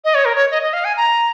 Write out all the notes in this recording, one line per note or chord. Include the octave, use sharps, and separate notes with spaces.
D#5
C#5
A#4
C#5
D#5
D#5
F5
G#5
A#5